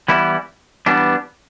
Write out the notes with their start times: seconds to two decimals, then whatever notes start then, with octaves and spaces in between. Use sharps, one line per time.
0.08 E3 G3 B3 E4
0.86 E3 G3 B3 D4